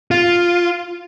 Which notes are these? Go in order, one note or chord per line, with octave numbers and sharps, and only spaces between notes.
F4